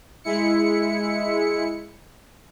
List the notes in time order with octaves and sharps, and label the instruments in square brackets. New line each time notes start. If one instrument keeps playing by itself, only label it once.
[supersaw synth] G#3 E4 C#7